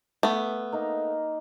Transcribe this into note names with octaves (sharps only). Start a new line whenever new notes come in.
A3 B3
A#3 D#4 A#5